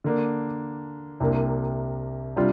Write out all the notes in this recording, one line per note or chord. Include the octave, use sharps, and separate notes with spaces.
D3 A#3 D4
C2 C3 A#3 D4
C3 G3 D4 F4